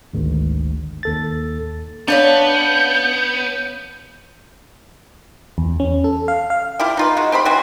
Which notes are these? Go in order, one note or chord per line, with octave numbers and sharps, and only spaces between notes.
G#1 D2
D#2 A4 A6
B3 C#4 D4 C#5 F5 A5 G6
E2
C#4
A4
F5
F5
F3 E4 G4
D#4 F4 B4
G#3 F#4
C4 G4 C5 B5
E3 F#3 C4 F#4